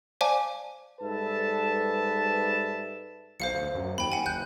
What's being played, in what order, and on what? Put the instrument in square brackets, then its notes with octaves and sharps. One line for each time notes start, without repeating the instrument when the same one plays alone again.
[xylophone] C5 D5 F5 G#5 A5 D6
[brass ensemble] G#2 G3 A4 B4 E5 A5
[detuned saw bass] B1 [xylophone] C5 F5 C#7
[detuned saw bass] D2
F#2
[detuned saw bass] D#2 [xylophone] G5 B5
[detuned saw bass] D#2 [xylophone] F#5 G#5
[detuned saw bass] F#1 [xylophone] F#6 G6